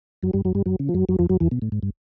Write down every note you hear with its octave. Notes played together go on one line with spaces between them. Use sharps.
F#2 F#3
G2 G3
F#2 F#3
G2 G3
F#2 F#3
C#3
F3
F#2 F#3
F#2 F#3
F2 F3
F#2 F#3
E2 E3
B2
A2
G#2
G2